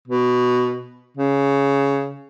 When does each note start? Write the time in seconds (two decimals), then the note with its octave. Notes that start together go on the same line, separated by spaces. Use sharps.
0.08 B2
1.17 C#3